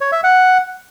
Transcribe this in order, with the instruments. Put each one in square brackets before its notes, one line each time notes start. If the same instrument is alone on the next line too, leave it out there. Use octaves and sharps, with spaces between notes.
[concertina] C#5
E5
F#5